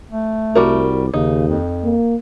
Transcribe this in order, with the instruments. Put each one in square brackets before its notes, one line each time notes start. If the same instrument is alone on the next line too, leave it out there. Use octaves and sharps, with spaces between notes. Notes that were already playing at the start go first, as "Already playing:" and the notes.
[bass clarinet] A3
[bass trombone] C2 [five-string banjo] G3 F#4 A#4
[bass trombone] D#2 [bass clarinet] C#3 [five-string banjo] D#4
[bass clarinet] F2
[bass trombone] A#3